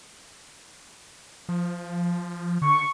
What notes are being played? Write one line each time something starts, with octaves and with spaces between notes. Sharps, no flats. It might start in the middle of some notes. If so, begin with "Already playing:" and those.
F3
D3 C#6